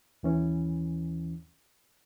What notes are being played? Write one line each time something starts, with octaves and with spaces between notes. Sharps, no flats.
D#2 E3 C#4